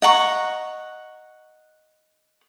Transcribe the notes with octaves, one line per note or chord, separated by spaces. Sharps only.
D#5 F#5 A#5 C#6